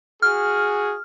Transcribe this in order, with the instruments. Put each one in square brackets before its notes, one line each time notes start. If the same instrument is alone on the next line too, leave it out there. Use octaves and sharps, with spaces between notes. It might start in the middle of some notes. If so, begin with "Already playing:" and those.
[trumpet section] F#4 G#4 [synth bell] F6